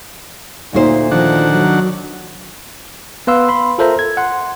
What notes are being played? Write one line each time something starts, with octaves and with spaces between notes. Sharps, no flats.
D2 A#2 D#4 C5
D#3 F3 D4 F#5
F#3
B3 B4 F5 C6 E6
B5 C6
F4 A4 A#4 C5 E5 A#5
G#6
F#5 C6